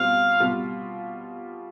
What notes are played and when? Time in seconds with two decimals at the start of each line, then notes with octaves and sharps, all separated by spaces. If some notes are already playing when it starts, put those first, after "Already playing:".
Already playing: B2 G3 C4 F4 F5
0.40 B2 G3 C4 F4